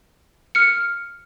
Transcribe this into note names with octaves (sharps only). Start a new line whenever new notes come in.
F6 C#7